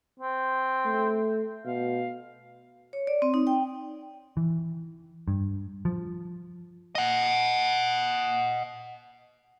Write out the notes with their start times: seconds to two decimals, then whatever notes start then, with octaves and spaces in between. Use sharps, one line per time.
0.20 C4
0.86 A3
1.66 B2 F5
2.93 C#5
3.07 D5
3.22 C4
3.34 D#4
3.47 G5
4.37 E3
5.28 G2
5.85 F3
6.95 D#5 F#5